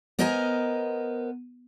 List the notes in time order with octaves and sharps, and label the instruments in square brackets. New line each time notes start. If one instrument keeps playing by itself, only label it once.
[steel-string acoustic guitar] B3 A#4 C5 D#5 G#5 A#5